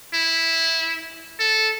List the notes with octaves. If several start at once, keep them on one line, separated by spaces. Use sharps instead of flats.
E4
A4